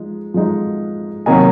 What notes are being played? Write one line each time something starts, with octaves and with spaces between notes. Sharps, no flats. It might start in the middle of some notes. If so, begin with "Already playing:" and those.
Already playing: F3 G#3 D#4
F3 G#3 D#4
C3 D#3 F#3 A#3 D#4 G#5